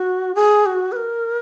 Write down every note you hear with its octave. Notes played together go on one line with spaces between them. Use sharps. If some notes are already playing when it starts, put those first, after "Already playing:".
Already playing: F#4
G#4
F#4
B4
A#4